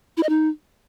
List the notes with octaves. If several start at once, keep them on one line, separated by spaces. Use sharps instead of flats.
E4
D#5
D#4